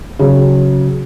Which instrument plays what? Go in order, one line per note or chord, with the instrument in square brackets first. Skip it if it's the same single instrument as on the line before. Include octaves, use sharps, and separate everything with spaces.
[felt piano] C#3 F#3